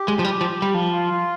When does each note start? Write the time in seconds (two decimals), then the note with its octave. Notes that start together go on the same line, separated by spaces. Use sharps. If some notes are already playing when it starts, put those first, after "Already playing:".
Already playing: G4
0.08 G#3
0.19 F3
0.24 G3
0.41 F3
0.62 G3
0.74 F3
0.91 F4